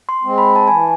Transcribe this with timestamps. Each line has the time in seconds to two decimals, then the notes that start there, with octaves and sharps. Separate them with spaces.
0.09 C6
0.23 G#3 C4
0.38 B5
0.56 A5
0.67 E3 G#5